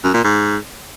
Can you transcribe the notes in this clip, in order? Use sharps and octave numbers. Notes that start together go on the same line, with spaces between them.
F#2
A#2
G#2